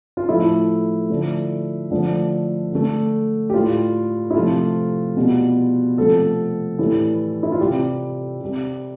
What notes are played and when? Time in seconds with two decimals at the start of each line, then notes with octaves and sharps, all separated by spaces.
0.17 F4
0.29 A2 F3 A3 E4
1.10 D3 F3 A3
1.91 D3 F3 A3
2.72 D3 A3
3.50 G4
3.54 A2 G3 F4
4.30 E4
4.34 C3 F3 A3 F4
5.17 B2 G3
5.97 C3 F3 A3 A4
6.78 A2 E3 G3
7.43 E4
7.52 F4
7.60 C3 G3 G4
8.41 C3 G3